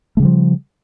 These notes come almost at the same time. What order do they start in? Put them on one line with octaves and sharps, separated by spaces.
A3 C#3 G3 F3